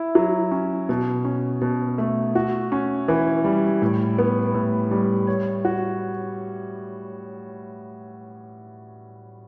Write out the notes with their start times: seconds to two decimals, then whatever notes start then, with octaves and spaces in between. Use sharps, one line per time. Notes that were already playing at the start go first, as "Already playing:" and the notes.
Already playing: E4
0.15 F#3
0.51 C#4
0.89 B2
1.25 C#4
1.61 B2
1.98 A3
2.35 F#4
2.72 C#4
3.08 E3
3.44 G3
3.82 A2
4.18 B3
4.54 A2
4.91 G3
5.27 C#5
5.65 F#4